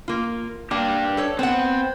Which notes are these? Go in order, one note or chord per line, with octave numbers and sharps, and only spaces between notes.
A#3 F4
A#3 D4 G4
A4 C#5
B3 C4 F#5